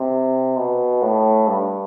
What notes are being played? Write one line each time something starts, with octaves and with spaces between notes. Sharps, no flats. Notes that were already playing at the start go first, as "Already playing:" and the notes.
Already playing: C3
B2
A2
G2